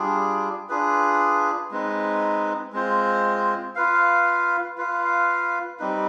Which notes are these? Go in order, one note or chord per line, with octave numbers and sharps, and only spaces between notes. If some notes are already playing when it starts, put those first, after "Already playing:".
Already playing: G3 D4 F4 G#4
D4 F4 G#4 B4
G#3 C4 D#4 B4
G#3 C4 F4 C5
F4 B4 F5
F4 B4 F5
G3 C4 D#4 B4